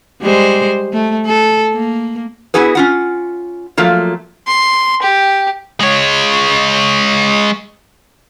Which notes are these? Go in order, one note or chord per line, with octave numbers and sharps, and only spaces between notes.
G3 G#3 C5
A3
A4
A#3
B3 E4 F#4 G#4 B4
C#4 F4 F#5
F3 F#3 A3 A#3 F4
C6
G4
G#3 C#5